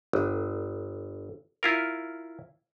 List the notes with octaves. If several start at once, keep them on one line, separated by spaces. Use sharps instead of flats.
G1
E4 F4 A#4